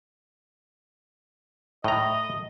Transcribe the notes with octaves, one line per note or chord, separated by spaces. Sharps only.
A2 D#5 A#5